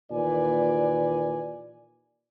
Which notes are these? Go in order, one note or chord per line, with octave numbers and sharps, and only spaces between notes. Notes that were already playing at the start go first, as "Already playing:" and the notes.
D#2 A#2 E3 B4 D5 G#5